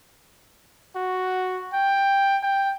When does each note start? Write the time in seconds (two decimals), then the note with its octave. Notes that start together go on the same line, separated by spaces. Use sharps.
0.96 F#4
1.73 G5
2.43 G5